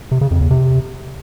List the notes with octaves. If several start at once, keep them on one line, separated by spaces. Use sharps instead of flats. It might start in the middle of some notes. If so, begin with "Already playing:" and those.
C3
C#3
F2
E2
C3